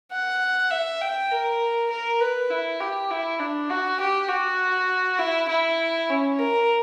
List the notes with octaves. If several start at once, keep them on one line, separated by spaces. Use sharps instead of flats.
F#5
E5
G5
A#4
A#4
B4
E4
G4
E4
D4
F#4
G4
F#4
E4
E4
C#4
A#4